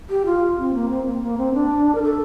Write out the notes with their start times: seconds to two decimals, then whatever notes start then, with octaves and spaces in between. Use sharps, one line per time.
0.10 G4
0.25 F4
0.58 C4
0.74 A#3
0.89 C4
1.06 A#3
1.22 A#3
1.38 C4
1.54 D4
1.95 A#4
2.02 A4